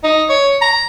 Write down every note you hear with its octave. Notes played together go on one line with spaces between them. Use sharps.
D#4
C#5
A#5